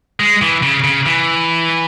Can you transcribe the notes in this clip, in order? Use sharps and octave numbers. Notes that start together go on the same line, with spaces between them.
G#3
E3
C#3
C#3
E3